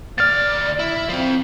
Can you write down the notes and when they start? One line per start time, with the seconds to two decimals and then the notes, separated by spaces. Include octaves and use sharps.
0.18 D2 D5 F6 A6
0.79 E4
1.09 F3 C4